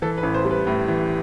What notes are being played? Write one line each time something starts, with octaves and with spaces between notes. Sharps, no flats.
E3 A4
B4
A1
C5
G3
B4
A2
E3